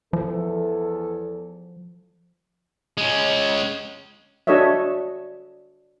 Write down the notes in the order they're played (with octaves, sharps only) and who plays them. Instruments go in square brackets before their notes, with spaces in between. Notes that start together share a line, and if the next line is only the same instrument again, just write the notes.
[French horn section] E2 E3 A4 [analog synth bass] F3
[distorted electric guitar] G#3 C#4
[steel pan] D4 F#4 A4 C#5 D#5 E5